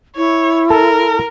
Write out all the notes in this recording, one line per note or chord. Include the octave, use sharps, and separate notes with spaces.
E4 C#5
A4 A#4 A5